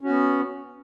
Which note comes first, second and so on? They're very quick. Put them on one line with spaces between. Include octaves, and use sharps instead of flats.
C#4 F#4 B3